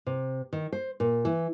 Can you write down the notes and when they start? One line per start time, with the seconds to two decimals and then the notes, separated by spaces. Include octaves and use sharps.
0.06 C3
0.53 D#3
0.73 C5
1.00 A#2
1.25 E3